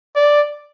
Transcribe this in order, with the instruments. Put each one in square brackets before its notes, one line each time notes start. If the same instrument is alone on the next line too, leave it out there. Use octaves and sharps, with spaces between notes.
[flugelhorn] D5